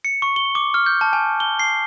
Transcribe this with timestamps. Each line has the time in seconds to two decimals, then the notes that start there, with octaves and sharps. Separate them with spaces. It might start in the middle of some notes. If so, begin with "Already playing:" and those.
0.05 C#7
0.22 C#6
0.36 G7
0.55 D6
0.74 F6
0.86 G6
1.01 A5
1.13 G#5
1.40 G7
1.59 C7